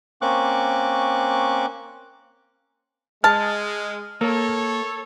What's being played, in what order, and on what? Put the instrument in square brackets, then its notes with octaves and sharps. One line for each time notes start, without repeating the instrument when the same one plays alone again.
[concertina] A#3 C4 C#4 C#6 D6 F#6
[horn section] G#3 [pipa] A5 [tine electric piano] F6
[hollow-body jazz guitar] A#3 [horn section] A4 C#5